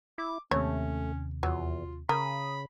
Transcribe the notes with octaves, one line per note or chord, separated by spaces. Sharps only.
E4 D6
D#2 C3 A3 C#4 C#5
E2 F#3 F4
C#3 A#4 B5 D#6